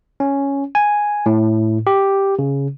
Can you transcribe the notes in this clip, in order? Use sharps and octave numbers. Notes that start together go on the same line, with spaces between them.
C#4
G#5
A2
G4
C#3